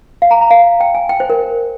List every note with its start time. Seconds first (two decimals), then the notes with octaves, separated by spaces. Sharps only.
0.22 F5
0.31 A#5
0.41 A#5
0.50 F5
0.80 G5
0.95 G#5
1.09 G5
1.20 C5
1.30 A#4